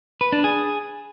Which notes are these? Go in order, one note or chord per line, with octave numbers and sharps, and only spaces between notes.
B4
D4
G#4